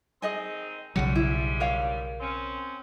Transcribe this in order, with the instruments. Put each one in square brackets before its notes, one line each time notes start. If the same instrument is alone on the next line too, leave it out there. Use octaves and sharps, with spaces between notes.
[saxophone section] D#3 C4 D#4 [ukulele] G#4 D#5 G#5
[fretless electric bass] B1 C#3 F#3 [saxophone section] G#2 G3 [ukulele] F#5
[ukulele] E4
A#4 C#5 F5
[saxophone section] C4 C#4